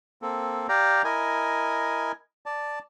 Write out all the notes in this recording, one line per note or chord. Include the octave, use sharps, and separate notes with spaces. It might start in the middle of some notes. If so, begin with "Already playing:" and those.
A#3 C4 A4
G4 D5 F5 G5 A#5
E4 A#4 D#5 G#5
D5 A5